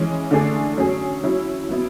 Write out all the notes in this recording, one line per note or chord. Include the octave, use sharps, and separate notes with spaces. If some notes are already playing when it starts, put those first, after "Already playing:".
Already playing: E3 G#3 C#4
D3 A3 D4 G#4
F#3 C#4 G#4
F#3 C#4 E4
F#3 B3 E4